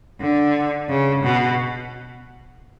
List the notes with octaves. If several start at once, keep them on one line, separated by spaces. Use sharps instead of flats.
D3
C#3
B2